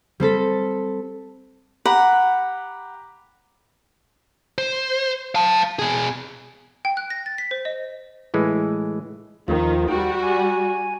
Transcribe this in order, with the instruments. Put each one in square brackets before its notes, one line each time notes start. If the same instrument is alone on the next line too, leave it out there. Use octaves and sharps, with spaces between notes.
[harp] G3 C4 A4 B6
[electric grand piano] G4 A#5 B5 [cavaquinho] F#5
[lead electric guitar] C5
F5 A5
B2 G#4
[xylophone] G5
F#6
A#6
A6
B6
C5
D#5
[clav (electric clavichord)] A2 E3 G#3
[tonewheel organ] D#2 F3 F4 [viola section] D#3
[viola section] G3 F#4 [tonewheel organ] G5
[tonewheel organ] G#5